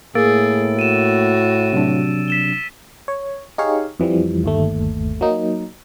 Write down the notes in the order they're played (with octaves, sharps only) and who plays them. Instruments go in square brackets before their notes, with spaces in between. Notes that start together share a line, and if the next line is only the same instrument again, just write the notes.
[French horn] A2 [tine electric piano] A#3 [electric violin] G#4 [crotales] E6 A6 D7
[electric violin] F#4 [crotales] D#7 E7
[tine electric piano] C3 F#3 D4
[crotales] B6 E7 G7
[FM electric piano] C#5
D#4 G4 G#4 C#5 F5
F2 E3 F3 G3
G1 D#2 A3
F#3 A#3 D#4